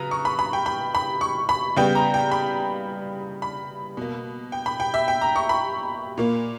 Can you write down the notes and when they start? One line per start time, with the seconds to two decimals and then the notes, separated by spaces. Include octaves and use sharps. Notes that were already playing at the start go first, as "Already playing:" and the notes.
Already playing: C#3 F#3 B4 A#5
0.11 C#6
0.25 B5
0.39 B5
0.53 G5
0.66 B5
0.95 B5
1.21 C#6
1.49 B5
1.76 C#3 G3 B3 G5
1.95 A#5
2.14 G5
2.31 B5
3.42 B5
3.97 B2 A#3
4.52 G5
4.66 B5
4.80 G5
4.94 E5
5.08 G5
5.21 A#5
5.36 C#6
5.49 B5
6.18 A#2 A#3